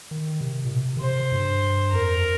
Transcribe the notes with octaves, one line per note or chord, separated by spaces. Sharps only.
D#3
C3
A#2
C3
D#3
C3 C5
G2
F2 A#4